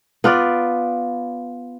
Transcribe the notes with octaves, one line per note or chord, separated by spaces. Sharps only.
B3 F4 B4 D5